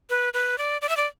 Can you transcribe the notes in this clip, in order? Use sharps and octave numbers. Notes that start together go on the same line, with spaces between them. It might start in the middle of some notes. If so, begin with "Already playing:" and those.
B4
B4
D5
D5
E5
D5